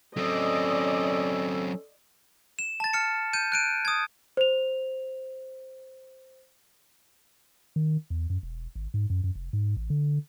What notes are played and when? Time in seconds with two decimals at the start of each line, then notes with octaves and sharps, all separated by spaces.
0.17 F#3 C4 C#4 A4 D5 D#5
2.59 E7
2.80 A5 A6
2.93 F6 C#7
3.33 G6 D#7
3.52 F#6 D7 D#7
3.85 D#6 G#6
4.37 C5 F7
7.76 D#3
8.10 E2
8.30 F#2
8.43 E1
8.75 G#1
8.94 G#2
9.10 F#2
9.24 F#2
9.35 F1
9.53 G#2
9.77 A1
9.90 D3